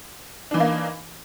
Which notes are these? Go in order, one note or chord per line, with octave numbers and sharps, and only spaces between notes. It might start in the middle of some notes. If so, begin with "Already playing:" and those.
E3 A#3 D4 D#4